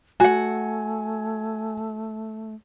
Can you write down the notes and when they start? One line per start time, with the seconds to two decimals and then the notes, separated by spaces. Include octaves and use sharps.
0.20 A3 F#4 F#5 G#5